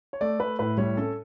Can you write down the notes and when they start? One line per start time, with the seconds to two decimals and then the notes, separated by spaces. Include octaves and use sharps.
0.13 C#5
0.21 A3 D5
0.39 A3 B4
0.59 A2 B4
0.78 G3 C#5
0.97 C#4 A4